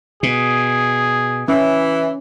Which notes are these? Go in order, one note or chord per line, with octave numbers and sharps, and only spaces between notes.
B2 G#4
E3 C#4